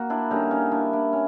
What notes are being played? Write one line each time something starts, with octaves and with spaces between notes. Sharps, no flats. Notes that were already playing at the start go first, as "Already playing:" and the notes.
Already playing: A#3 F#4
D4 E4
D3 G3 A#3 C#4 D#4
C#4 D#4
D4 E4
D4 E4
C#4